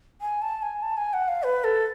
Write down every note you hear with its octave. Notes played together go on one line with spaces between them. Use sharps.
G#5
A5
G#5
A5
G#5
F#5
F5
B4
A4